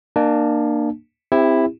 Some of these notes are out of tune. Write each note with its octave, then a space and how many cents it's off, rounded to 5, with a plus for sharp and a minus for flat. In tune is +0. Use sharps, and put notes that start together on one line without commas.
A#3 +0 D4 +35 A5 -40
C4 +0 E4 +5 G4 +35